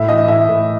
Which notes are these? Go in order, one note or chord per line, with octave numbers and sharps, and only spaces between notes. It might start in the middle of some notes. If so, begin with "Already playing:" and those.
Already playing: A2 E5
E3 D#5
A2 E5
A2